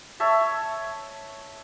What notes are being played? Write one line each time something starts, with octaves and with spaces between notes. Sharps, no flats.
C#5 E5 A5